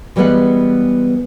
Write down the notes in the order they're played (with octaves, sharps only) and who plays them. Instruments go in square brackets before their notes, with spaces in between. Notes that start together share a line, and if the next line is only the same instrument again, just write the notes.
[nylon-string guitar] E3 G3 G#3 B3 B4 F#5